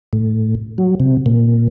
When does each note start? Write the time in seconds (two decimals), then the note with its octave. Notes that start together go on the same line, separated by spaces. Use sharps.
0.13 A2
0.78 F#3
1.00 C3
1.26 A#2